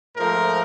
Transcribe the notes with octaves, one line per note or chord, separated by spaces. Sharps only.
G#2 F3 A3 A#4